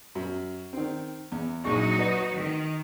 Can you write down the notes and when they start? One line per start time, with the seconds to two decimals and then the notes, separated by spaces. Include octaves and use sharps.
0.15 F#2
0.73 D#3 C4
1.32 E2
1.64 A#1 F#3 D#4 F#4 G#4 C#6
1.99 B4 D#5
2.36 D#3